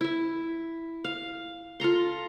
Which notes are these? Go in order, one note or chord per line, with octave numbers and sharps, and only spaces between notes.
E4 E5
F5
F4 A4 A#5 C6